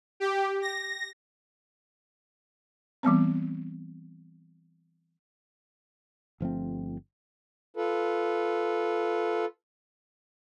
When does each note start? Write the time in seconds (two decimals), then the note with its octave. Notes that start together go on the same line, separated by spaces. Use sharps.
0.20 G4
0.62 A#6
3.03 E3 G3 B3 C4
6.40 G1 F3 A3 C4
7.77 F4 A4 B4